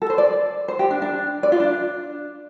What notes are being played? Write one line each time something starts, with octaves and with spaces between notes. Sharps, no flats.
A4
C5
D5
C5
G4
D4
D4
D5
F4
D4